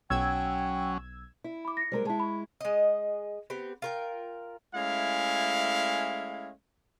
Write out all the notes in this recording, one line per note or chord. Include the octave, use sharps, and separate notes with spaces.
B1 F#3 C#4 G5 E6 G#6
E4
B5 D6
A#6 C#7
G3 G#3 A#4 C5 A#5
G#3 E4 G#4 A5
B5 C#6
G#3 D#5
B3 C4 G4
F4 A#4 G5
G#3 A3 C#4 E4 F5